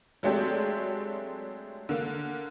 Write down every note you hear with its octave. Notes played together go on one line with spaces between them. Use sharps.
F#3 G#3 A3 C4 D4 G4
D3 A#3